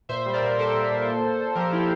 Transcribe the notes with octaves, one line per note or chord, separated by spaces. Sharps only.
A#2 C5 E5
G3
A#4 D5
A#2
A#2 A4 C5
A#2
A#2
A#2
A#2
A#2
F3 G4 A#4
F3 E4 G4